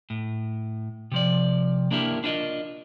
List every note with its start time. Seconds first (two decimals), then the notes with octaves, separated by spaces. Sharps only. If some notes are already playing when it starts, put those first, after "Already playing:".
0.10 A2
1.12 C3 F3 D5
1.91 A#3 D4 E4 G4 A#4
2.24 D4 E4 F4 A#4 D#5